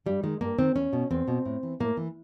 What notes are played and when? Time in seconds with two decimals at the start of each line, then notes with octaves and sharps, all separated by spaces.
0.06 G2 G3
0.23 D#3 G#3
0.41 G2 A#3
0.59 D#3 C4
0.75 E2 C#4
0.93 B2
1.11 E2 C4
1.28 B2
1.46 A2
1.63 E3
1.80 A2 A#3
1.97 E3